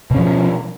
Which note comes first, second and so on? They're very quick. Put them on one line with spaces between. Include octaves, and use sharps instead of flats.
B2 C#4 F3